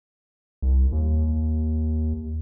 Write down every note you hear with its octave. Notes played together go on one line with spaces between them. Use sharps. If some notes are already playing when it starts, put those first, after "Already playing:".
C2
D#2